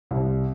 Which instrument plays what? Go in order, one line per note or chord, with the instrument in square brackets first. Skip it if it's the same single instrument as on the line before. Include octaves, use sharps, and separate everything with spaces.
[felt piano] C2